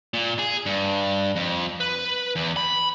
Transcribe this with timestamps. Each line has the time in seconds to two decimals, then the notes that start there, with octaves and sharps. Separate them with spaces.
0.14 A#2
0.39 G#4
0.66 G2
1.36 F2
1.80 B4
2.36 E2
2.57 B5